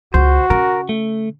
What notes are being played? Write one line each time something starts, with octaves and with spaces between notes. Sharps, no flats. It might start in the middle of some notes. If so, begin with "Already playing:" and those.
C#2 F#4 C5
C#3 A#4
A3